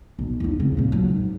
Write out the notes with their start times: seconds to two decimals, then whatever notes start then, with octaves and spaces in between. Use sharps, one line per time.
0.19 B1
0.40 E2 D#4
0.60 C#3 C4
0.77 A#2 C4
0.92 F#3
1.09 G#2